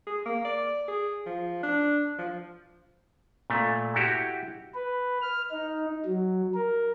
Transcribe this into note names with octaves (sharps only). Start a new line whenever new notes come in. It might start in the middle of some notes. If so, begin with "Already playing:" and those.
G#4
A#3
D5
G#4
F3
D4
F3
A#2 A3
E4 F#4 G4
B4
F6
D#4
F#3
A#4